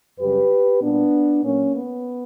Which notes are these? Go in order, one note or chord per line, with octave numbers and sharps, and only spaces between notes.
F#2 C#3 G3 G4 B4
A#2 G3 B3 D4
A#2 F#3 A#3 C#4
B3